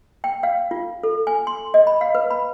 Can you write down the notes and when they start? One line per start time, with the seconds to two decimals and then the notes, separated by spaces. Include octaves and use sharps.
0.24 G5
0.43 F5
0.71 F4
1.03 A4
1.27 G#5
1.47 C6
1.74 D#5
1.87 B5
2.01 F5
2.15 B4
2.31 B5